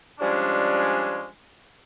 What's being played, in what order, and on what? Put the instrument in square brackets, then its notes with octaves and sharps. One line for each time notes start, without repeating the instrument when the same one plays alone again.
[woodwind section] F3 G3 G#3 C#4 D4